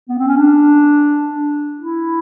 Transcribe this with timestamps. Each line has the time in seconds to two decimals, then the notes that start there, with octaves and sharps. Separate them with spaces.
0.09 B3
0.18 C4
0.28 C#4
0.37 D4
1.79 E4